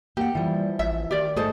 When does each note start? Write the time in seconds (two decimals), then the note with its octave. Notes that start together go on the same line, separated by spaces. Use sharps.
0.17 A#3 G4 F#5
0.35 E3 F3 G3
0.79 A1 E5
1.11 D#3 G4 D5
1.36 G#2 A3 G#4 C5 A5